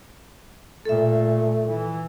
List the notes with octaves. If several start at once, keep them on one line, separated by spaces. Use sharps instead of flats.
A#2 A3 A4 E5
E3